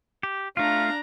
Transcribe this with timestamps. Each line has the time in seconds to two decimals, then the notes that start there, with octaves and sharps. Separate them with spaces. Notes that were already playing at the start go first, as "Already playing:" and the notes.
0.23 G4
0.57 A3 D4 F4 F5 A#5